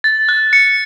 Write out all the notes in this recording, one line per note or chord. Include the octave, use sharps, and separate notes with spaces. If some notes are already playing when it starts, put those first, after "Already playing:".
A6
F#6
C#7